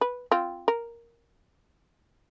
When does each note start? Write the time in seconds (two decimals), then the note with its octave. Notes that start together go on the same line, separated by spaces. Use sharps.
0.01 B4
0.32 C4 F4
0.68 A#4